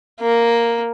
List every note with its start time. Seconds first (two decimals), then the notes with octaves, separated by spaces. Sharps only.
0.21 A#3